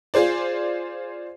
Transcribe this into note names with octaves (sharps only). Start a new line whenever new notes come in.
F4 G#4 C5 D5